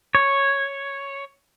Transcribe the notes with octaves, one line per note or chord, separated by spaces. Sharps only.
C#5